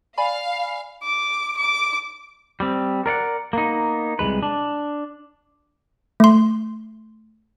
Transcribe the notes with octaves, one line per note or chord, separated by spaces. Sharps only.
D5 F5 G#5 B5
D6
D6
G3 C4
A#4 D5 F5 F#5
A#3 B3 D#4
C2 A#2 G#3 B4
D4
A3 C6